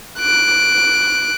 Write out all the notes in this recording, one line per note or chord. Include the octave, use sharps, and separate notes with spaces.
F#6 D7